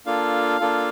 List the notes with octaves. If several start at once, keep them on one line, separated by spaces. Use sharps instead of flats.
A#3 D4 F4 A4 F5
A#3 D4 F4 A4